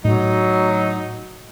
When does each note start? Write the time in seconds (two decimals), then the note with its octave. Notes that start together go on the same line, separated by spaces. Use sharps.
0.05 A2 F#3 D#4